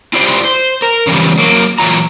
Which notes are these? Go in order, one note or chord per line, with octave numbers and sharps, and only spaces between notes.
E4 F4 G4 C5 D5
C5
A#4
C#3 E3 F3 G3
F#3 A#3
A#2 E3 F#3 F4 A#5